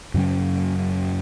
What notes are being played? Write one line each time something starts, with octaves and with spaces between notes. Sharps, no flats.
F#2 C#3 F#3 C#4